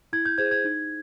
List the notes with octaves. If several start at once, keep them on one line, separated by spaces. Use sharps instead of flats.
E4 G#6
G6
G#4 C5 G#6
G#6
D#4